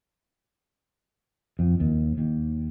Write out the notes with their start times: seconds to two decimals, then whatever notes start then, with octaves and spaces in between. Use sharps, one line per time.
1.59 F2
1.80 D#2
2.18 D#2